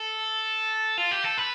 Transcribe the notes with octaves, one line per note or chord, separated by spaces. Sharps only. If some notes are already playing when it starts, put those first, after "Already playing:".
Already playing: A4
F4
G4
A4
B4